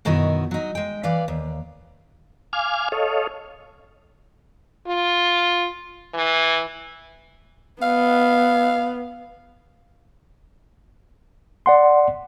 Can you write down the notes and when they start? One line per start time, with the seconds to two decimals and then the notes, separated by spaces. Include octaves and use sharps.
0.05 F#2 B2 D#3 D#4 E4 F#4
0.51 F#3 D#4
0.75 G#3 G5
1.03 E3 B4 D5 F5
1.28 D#2
2.53 F5 G#5 D6 F6
2.92 A4 C#5 D#5 F5
4.87 F4
6.14 E3
7.82 B3 F5
11.66 D5 F#5 C6